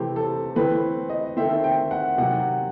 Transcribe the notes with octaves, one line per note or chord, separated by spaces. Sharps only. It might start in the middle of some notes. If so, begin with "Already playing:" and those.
Already playing: C3 E3 A3 C4 G4
A4
E3 A3 C4 B4
D#5
D#3 A3 C4 E5
G5
F#5
C3 D#3 F#3 F#5